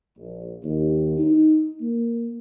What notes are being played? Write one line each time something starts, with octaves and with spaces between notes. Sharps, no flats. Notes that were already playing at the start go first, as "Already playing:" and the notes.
A#1
D#2
D#4
A#3